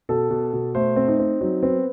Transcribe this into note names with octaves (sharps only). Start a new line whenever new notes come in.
B2 A4
B2
B2
A3 C5
C4
D#4
C4
F#3 D#4
B3 C4